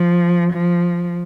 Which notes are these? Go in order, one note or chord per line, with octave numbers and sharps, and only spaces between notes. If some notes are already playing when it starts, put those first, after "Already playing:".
Already playing: F3
F3